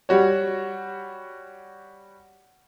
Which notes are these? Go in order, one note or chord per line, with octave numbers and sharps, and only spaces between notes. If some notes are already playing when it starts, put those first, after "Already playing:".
G3 F#4 C#5